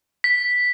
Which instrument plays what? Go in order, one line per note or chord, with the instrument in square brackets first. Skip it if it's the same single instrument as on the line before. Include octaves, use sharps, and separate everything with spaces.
[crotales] B6